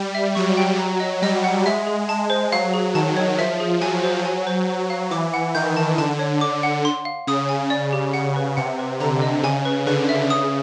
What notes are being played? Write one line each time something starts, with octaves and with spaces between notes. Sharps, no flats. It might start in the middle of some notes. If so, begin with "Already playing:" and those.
Already playing: G3
E5
F#3 C#6
G5
A#5
D#5
G3 D#5
F#5
G#3 E5
G#4
G#3 A5
C5
F#3 F5
G#4
D#3 A5
C#5
F3 E5
G#4
F#3 G#5
C5
G#5
C5
C5
F5
E3 D6
F#5
D#3 G6
A5
D3 A5
C#5
D6
F#5
C6
F5
C#3 D#6
G#5
C#3 D5
G4
C#3 F#5
B4
C3 F#5
B4
D3 A#5
D#5
C#3 G#5
B4
D3 B4
E5
C#3 D#6